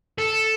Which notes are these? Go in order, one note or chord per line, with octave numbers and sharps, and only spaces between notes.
A4